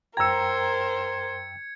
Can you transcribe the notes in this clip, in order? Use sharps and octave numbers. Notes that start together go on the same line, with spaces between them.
F#2 A#4 C5 G5 A#5 E6 G#6 C#7